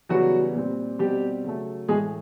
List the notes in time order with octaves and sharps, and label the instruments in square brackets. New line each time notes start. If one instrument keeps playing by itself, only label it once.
[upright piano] C#3 E3 F#3 G3 B3 F#4
A#2 G3 C4
B2 G3 C4 G4
C#3 F#3 A3
A2 E3 G#3 A3 G#4